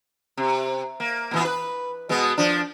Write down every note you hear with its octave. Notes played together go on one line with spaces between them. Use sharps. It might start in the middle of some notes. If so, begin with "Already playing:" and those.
C3
A#3
A#2 E3 B3
B4
B2 G#3 B3
F3 D4